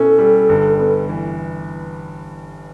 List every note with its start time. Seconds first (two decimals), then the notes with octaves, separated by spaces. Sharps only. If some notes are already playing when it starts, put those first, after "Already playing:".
Already playing: B2 C#4 E4 A4
0.19 G3
0.49 G1
0.79 B3
1.09 E3